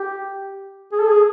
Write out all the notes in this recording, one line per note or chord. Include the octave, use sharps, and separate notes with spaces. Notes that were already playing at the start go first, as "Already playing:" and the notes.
Already playing: G4
G#4
A4
G#4